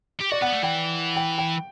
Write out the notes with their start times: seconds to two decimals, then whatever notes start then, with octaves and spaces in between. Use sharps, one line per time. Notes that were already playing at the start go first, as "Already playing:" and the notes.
0.21 G4
0.31 F#4 D5
0.42 B3 F#5
0.53 A3
0.63 E3 G5
1.16 G5
1.38 G5